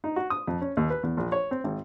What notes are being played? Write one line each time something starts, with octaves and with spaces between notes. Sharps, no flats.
D#4
F#4
D#6
F2
C#4
D#2
B4
E2
A#1
C#5
C4
G#1